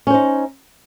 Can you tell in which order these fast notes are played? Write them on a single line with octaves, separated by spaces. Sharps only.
C#4 C5 D#4